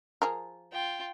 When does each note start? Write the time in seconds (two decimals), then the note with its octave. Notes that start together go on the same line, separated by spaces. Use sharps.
0.22 F3 G#4 A#4
0.72 F4 G5